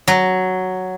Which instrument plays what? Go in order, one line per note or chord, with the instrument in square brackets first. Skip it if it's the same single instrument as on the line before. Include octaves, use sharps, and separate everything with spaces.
[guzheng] F#3